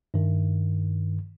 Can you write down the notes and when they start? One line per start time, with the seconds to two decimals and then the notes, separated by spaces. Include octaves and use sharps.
0.14 G2 D#3